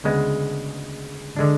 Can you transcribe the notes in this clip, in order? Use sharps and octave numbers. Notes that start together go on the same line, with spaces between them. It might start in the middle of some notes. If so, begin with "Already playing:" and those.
D2 C#3 G#3 B3
D3 G#3 D4